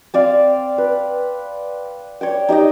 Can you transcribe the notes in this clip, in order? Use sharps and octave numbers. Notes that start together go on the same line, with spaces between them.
C4 D5 F5
B4
C#5 D5 G5
D#4 G4 D5 D#5